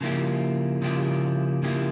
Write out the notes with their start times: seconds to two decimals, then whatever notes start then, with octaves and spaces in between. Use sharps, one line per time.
0.01 C#3 F3 A#3 E4 G4
0.82 C#3 F3 A#3 E4 G4
1.63 C#3 F3 A#3 E4 G4